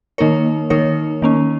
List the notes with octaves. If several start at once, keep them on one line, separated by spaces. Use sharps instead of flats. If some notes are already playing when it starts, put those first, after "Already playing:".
D#3 A#3 D#4 A#4 C#5
D#3 A#3 D#4 A#4 C#5
D#3 A#3 C#4